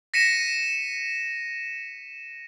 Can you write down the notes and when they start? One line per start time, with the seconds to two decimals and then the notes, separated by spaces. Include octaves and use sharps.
0.14 A#6 B6 C#7 D#7 E7